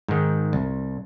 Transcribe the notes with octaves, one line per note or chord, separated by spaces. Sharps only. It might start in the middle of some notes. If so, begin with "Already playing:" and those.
G#2 D#3
C2